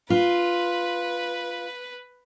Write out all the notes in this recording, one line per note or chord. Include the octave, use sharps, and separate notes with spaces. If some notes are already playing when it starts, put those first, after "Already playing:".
F4 B4